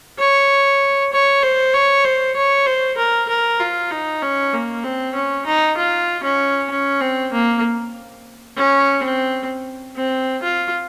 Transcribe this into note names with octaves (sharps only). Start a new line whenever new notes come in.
C#5
C#5
C5
C#5
C5
C#5
C5
A#4
A#4
F4
D#4
C#4
A#3
C4
C#4
D#4
F4
C#4
C#4
C4
A#3
C#4
C4
C4
F4